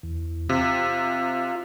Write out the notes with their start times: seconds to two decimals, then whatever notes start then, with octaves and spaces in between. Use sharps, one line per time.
0.03 E2
0.49 C3 F4